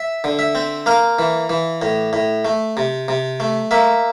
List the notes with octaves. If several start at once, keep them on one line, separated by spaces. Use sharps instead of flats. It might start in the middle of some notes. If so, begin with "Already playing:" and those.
Already playing: E5
D3
E5
C4
A#3 F5
E3
E3
A2
A2
A3
C3
C3
A3
A#3 E5